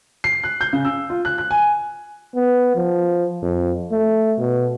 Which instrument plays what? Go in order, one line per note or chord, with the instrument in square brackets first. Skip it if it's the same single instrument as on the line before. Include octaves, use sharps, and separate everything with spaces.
[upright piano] C7
F#6
G6
C#3
E6
F4
F#6
F#6
G#5
[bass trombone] B3
F3
F2
A3
B2